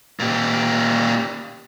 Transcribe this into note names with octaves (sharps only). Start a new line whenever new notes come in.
A#2 G4